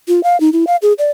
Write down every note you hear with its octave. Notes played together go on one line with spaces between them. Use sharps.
F4
F5
D#4
E4
F5
G#4
D5